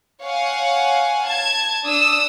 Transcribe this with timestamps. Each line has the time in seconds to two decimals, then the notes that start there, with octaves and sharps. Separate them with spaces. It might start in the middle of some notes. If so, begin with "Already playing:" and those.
0.24 C#5 F5 F#5 G#5
1.27 A5 G#6
1.85 D4 D#6 E6